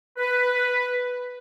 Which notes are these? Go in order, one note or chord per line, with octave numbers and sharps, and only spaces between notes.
B4